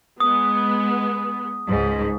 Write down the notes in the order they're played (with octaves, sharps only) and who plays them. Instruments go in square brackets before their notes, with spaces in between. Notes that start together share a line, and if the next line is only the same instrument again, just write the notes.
[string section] G#3 B3 [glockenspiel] D#6
[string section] C#2 G#2